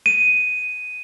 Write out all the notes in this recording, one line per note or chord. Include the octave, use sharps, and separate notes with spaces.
D#7